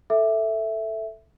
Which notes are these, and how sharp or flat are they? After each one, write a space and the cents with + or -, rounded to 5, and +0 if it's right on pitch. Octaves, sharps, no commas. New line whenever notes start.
A4 +0 E5 +0